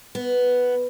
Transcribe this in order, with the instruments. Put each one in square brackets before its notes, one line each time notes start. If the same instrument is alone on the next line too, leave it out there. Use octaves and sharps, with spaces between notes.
[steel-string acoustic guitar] B3